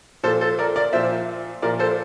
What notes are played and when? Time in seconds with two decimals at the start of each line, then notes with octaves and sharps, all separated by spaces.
0.23 A#2 F3 A4 C5
0.41 A4 C5
0.59 A#4 D5
0.76 A#4 D5
0.93 A#2 F3 C5 E5
1.62 A#2 F3 A#4 D5
1.79 A4 C5